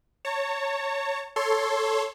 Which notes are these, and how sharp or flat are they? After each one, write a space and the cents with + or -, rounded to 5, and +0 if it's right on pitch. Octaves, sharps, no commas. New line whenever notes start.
C#5 +0 A5 +45
A4 +0 C#5 +0 C6 +15